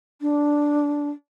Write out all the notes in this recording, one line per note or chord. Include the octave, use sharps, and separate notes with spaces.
D4